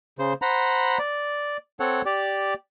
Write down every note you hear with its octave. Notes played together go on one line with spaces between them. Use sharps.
C#3 C5
C5 F#5 A#5 B5
D5
C4 A4 C#5 F#5
G4 D5